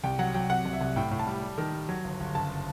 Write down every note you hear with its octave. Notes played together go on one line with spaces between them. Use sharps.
C2 G5
F#3 F#5
F#3 G5
C3 F#5
C2
E5
C2
A2 G5
A2
A5
G3
G3
D#3
G3
F#3
G1
G1
F#1 A5